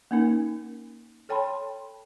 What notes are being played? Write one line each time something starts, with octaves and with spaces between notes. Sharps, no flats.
A#3 C#4 D#4 A#4
A4 C#5 G5 A5 B5 C6